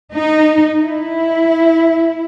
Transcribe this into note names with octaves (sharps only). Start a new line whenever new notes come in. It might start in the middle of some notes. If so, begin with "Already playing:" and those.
D#4
E4